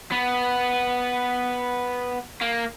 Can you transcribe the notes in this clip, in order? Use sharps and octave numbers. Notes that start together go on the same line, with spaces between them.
B3
A#3